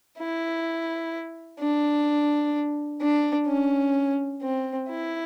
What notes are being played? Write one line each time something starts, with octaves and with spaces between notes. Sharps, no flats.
E4
D4
D4
C#4
C4
E4